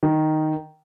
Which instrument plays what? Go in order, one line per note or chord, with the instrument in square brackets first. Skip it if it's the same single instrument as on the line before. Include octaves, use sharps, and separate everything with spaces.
[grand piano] D#3